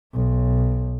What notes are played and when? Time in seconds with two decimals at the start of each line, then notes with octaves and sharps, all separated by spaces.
0.14 B1